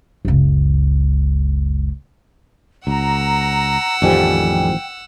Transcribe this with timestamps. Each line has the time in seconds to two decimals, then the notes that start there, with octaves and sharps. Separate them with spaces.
0.25 F#1 C#2
2.87 C#2 F#5 A#5 E6
4.02 A1 F2 D#3 F3 G3 G5 G#5